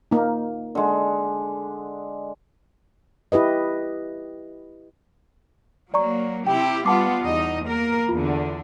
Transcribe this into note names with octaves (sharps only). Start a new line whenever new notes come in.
A#3 D#4
D3 G#3
E4 G4 B4 D#5
F#3 A#3 D5 A#5 C#6
C3 E4 G4 G5
G3 B3 F4 F#5 A5 D6
E2 D#4 D#5
A#3 A#4
E2 D3 F4